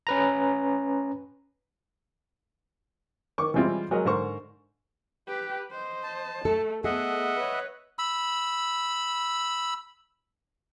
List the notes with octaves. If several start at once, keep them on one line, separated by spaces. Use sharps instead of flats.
C#4 B4 A#5
D#3 C#6 D6
E3 G3 G#3 C4 E4 F4
F#3 G#3 A#4 D#5
G#2 D3 A#4 C5 C#6
G4 B4
C5 D#5
A5
A3 A4
A3 B3 G#4 D#5 E5 F#5
B4 C#5
B5 E6